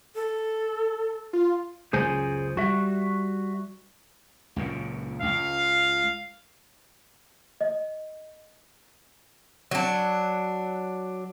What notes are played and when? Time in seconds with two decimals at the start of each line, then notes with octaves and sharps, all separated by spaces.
0.15 A4
1.33 F4
1.93 C#2 F#2 C#3 G#4 C5 G#5
2.57 G3 F#4 E5
4.56 C#2 F#2 A#2
5.22 C#2 F5
7.61 D#5
9.71 F#3 D4